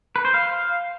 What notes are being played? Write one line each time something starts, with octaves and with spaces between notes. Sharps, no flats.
B4
C5
F5